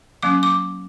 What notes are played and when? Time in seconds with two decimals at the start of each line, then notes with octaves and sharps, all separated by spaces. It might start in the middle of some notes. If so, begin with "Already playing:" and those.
0.23 F#3 A#3 C#4 D6
0.43 D6